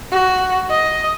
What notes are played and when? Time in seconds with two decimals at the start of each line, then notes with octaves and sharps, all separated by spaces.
0.12 F#4
0.70 D#5